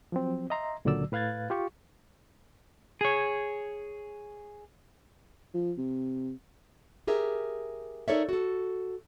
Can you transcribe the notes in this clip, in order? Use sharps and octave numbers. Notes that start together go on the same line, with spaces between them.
F3 F#3 C4
D#5 E5 A#5 C6
C#2 A#2 D3 F#3 D5 E6
A2 B4 F5 F#6 G#6 A6
F4 G4 C#6
G#4 C#5
F3
C3
G4 G#4 A#4 E5
D#4 A4 A#4 C#5 D5 E5
F#4 A4